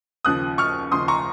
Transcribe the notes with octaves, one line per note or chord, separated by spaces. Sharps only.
D#2 C#3 F3 D#6 F#6
C#6 F6
D#2 C#3 F3 C6 D#6
A#5 C#6